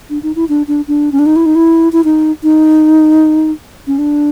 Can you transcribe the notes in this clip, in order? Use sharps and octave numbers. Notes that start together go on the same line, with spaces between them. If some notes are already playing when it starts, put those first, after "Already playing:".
D4
D#4
E4
D4
D4
D4
C#4
D4
D#4
E4
D#4
E4
E4
D#4
D#4
C#4
D4